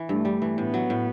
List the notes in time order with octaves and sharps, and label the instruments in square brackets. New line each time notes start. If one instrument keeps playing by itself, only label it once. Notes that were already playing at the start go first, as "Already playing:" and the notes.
Already playing: [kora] E3
[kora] G2 [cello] A3
[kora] G3
E3
[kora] A2 [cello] B3
[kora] F#3
A2